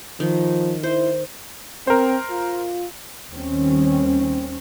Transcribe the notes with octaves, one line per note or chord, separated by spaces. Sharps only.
D#3 F3
E4 C5
C4 A#4 C5
F4
D#2 D#3 G3 C4 C#4